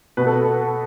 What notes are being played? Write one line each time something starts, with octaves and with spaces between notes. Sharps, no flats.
B2 B4
A4